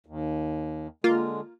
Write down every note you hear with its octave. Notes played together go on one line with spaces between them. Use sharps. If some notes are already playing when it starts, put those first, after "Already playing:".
D#2
D3 G#3 A#3 F4